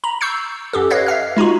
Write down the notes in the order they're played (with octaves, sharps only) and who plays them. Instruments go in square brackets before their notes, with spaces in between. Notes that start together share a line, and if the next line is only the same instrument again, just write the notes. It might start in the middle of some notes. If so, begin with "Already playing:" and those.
[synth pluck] A#5 B5
C#6 E6 G6 C7 C#7
F#2 G4 A4
B4 C#5 D#5 F5
E5 F5 F6
G#3 D#4 F4 F#4